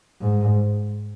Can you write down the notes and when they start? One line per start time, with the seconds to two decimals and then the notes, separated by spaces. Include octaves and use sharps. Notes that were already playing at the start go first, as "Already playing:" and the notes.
0.21 G#2